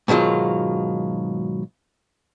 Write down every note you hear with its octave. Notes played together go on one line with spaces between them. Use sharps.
G#2 B2 D#3 F#3 F4